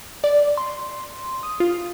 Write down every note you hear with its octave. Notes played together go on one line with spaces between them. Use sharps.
D5
C6
D#6
F4